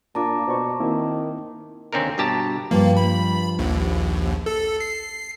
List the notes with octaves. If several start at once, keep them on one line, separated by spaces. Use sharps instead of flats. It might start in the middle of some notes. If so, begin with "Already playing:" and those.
A#2 A#3 D4 F4 A5 A#5 D6
B2 C5 D5 C#6
D#3 A#3 C4 E4
D#2 D3 C4 C#4 D#4 A#4
G2 B2 G4 A5 A#5
G2 F3 A#3
B5
A#1 D#2
A4
C7